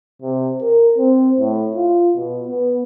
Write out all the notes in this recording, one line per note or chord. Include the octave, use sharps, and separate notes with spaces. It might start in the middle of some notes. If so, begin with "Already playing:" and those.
C3
A#4
C4
A2
F4
B2
B3